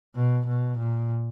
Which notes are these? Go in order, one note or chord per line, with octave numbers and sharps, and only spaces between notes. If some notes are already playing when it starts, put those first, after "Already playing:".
B2
B2
A#2